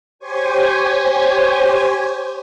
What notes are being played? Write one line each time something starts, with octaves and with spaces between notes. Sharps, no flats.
G4 C5 C#5 G#5